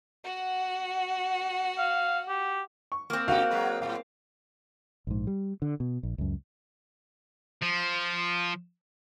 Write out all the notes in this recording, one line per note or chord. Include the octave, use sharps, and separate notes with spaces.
F#4 F#5
F5
G4
C#6
A#3 C4
C#3 D#4 F#4 G4 F5
F#3 G#3 B4
A2 F#3 F5
A#1 G#2
G3
D3
B2
A#1
C#2 F#2
F3